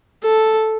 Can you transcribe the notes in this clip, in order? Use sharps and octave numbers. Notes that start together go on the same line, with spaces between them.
A4